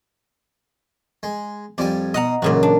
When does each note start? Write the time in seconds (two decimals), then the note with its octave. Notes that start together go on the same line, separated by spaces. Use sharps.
1.23 G#3
1.78 F2 G3 D5 G#5
2.14 B2 D#5 F#5 A#5 D#6
2.42 A1 F#2 A#2 C#3 F#4
2.63 D4